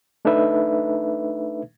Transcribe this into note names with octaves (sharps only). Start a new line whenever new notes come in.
A3 D4 D#4 A4 B4 E5